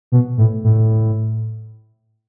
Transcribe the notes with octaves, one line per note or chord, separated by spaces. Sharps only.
B2
A2
A2